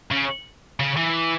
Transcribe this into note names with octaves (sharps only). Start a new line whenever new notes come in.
C#3
C#3
E3